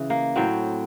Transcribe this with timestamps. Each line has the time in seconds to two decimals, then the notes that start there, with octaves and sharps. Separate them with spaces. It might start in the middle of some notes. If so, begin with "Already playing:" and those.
Already playing: C#3 E3
0.10 A#3
0.36 A2 F#3 C4